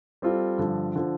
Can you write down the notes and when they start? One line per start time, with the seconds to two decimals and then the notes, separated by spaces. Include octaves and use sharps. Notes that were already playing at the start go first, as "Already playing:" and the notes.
0.22 G3 C4 F4 A4
0.58 G2 D3 F3
0.96 D3 F3